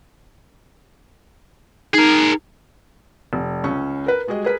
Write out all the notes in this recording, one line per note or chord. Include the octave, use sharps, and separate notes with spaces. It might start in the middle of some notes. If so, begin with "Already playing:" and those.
D#4 G#4 A#4
F1
C#2 C#4 C#6
A#4 B4
G3 G#3 F#4 G#4 D#5
G#4 A#4 B4 B6